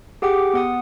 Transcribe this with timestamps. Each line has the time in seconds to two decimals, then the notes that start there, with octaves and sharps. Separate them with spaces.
0.22 G4 G#4 F#5 G5 D6
0.54 B3 F#5 D#6